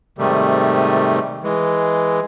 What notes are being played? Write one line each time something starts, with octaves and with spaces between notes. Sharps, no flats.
G#2 C3 D#3 G3 A3
E3 G#3